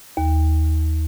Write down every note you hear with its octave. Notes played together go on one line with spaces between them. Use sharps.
D#2